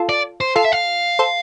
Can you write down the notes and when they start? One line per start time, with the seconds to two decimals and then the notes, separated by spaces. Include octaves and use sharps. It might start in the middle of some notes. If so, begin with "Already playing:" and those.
Already playing: F4 A4
0.09 D5
0.41 C5
0.56 F4 A4 F5
0.64 E5
0.72 F5
1.19 A4 C5